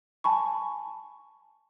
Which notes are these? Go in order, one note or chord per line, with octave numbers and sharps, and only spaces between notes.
G#5 A5 B5 C#6